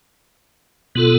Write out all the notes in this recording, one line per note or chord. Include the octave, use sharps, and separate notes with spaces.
B2 B3 F4 A4